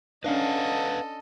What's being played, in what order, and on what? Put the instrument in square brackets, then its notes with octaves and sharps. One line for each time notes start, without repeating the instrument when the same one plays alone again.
[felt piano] C#4 D4 [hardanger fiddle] A4 D#5 [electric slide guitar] B4 F5 F#5